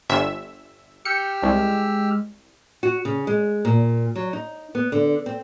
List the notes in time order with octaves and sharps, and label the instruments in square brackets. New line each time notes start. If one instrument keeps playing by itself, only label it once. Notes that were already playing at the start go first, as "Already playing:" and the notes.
[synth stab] G1 E5
[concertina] G4 E6 F6 [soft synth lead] G6 [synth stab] C#7
[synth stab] C2 [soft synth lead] G#3
[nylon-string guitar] F#4
C#3
G#3
A#2
F#3
D#4
B3
D3
C4